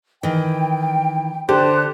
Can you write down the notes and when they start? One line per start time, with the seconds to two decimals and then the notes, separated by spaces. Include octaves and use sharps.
0.23 D#3 E3 G5
1.49 D3 D4 G4 C5 A5 F#6